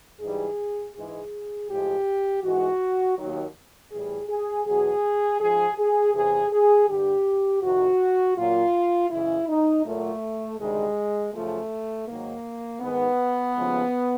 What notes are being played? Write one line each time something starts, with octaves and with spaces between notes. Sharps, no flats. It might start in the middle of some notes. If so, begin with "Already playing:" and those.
G#2 E3 G3 G#4
G#2 E3 G#3 G#4
A2 F3 G#3 G4
G#2 E3 G#3 F#4
D#2 D#3 F#3
A2 E3 G3 G#4
G#4
E2 B2 F#3 G#4
G#2 F3 G#3 G#4
G#4
E2 C3 E3 G#4
G#4
G2 D3 G3 G4
F2 C3 D#3 F#4
A#2 F#3 F4
F#2 C#3 E3 G#3 E4
D#4
A#2 F#3 A3
D2 C3 D#3 G3 G#3
F#2 C#3 F3 A3
G#2 D#3 F#3 A#3
G#2 D#3 G#3 B3
D#2 C#3 F3 G#3